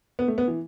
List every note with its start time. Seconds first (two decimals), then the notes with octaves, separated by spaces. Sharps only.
0.19 B3
0.28 A3
0.38 B3
0.48 E3